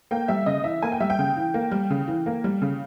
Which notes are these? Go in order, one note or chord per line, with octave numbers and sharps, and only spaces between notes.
A#3 G5
G3 E5
C#3 D#5
E3 E5
A#3 G#5
G5
G3 E5
G5
C#3
E3
A#3
G3
C#3
E3
A#3
G3
C#3